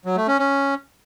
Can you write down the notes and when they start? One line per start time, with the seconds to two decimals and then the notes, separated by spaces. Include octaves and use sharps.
0.05 F#3
0.17 A3
0.28 C#4
0.39 C#4